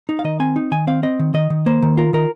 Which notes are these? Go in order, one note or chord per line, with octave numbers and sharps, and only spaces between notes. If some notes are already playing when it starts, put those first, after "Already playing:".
D#4
F5
D#3 D#5
C4 G#5
D#4
D#3 G#5
C4 F5
C4 D#5
D#3
D#3 D#5
D#3
A#3 C5
D#3
F4 A#4
D#3 A#4